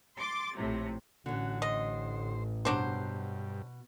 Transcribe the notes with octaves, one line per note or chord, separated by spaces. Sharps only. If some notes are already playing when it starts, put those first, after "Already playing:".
C6 D6 A6
A#1 A2 C3
A1 D3 C#4 F#4
C5 D#5
G2 B2 F#3 D4 C5